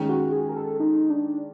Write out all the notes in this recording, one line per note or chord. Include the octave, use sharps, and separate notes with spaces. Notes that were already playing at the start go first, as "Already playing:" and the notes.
Already playing: D#3 G#3 C#4
F#4
G#4
A#4
A4
D#4
D4